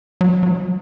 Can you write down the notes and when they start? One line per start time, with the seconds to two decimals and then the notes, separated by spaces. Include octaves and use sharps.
0.21 F#3
0.43 F#3